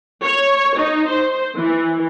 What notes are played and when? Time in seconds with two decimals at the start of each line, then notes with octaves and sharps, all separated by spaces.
0.22 C#5
0.76 D#4
1.09 C5
1.56 E3